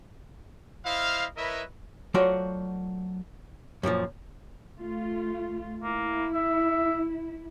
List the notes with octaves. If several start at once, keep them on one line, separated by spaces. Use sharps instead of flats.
E4 C5 D#5 F5
E4 A#4 B4 C#5 D#5 E5
F#3 A3 F4 F#4 C5 D5
F#2 A#2 D#3 F3
A3 F4
A#3 E4
E5